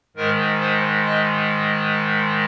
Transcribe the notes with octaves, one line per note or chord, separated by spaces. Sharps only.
G#2 D#3 G#3 A#4
C5
D#5